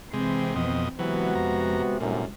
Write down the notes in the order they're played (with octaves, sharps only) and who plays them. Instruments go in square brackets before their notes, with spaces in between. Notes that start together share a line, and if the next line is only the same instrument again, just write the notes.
[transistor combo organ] C3 G#3 [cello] E3 C4
[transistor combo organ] F2 B2 D#5
[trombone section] C3 B3 F#4 [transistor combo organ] E3 F#3 [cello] G#3
[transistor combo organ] F2 A#5
[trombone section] C2 F#2 D3 [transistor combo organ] A#2